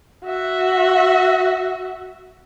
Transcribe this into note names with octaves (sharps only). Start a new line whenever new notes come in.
F#4 E5